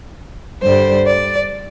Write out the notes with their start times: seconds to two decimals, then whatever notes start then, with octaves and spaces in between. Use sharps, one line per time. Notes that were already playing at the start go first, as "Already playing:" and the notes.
0.62 G2 D3 G3 C5
1.07 D5